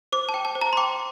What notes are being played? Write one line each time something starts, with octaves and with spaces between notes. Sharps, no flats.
C5 D6
A5
G5
A5
C5
A#5
C6
G5 D6